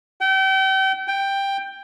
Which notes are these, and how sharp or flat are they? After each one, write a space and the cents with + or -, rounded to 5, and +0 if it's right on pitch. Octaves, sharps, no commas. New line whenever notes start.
G5 -35
G5 +10